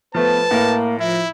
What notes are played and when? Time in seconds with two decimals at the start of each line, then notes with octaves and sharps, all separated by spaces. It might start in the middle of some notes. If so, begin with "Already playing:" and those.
0.15 F3 A3 B3 B4 A5
0.51 A2 A#3 A#4
1.00 F3 E4 E5